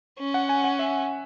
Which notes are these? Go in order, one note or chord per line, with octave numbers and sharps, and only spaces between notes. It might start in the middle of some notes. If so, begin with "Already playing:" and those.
C#4
F#5
G#5
F#5
E5